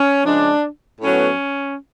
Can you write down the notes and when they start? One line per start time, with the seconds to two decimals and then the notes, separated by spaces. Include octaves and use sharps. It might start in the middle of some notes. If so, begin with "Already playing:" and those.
Already playing: C#4
0.24 C#3 F3 G#3 D4
1.01 A2 F#3 B3 C#4